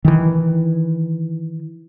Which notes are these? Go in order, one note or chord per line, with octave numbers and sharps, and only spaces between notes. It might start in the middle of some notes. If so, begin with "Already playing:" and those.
D#3 E3